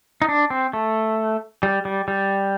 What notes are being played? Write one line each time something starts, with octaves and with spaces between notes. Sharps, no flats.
D#4
D4
C4
A3
G3
G3
G3